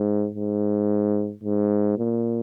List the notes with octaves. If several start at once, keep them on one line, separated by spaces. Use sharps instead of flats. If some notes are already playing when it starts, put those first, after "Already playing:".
Already playing: G#2
G#2
G#2
A#2